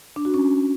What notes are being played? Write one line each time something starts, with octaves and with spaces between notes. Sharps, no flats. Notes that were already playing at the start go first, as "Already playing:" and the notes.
D4
F#4
C#4